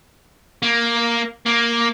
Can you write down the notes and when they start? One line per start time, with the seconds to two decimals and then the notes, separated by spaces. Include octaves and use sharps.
0.63 A#3
1.46 A#3